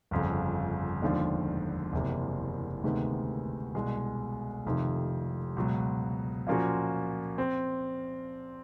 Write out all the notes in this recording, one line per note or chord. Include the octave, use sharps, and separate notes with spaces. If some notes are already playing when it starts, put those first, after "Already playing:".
G1 F2 C#3
E1 D#2 D3 F3
F#1 E2 C3
D2 C3 D#3 G#3 B3
C2 B2 G#3
F1 F2 C3 D#3
C#2 B2 F#3
A#2 F3 A#3 C#4 F#4
C4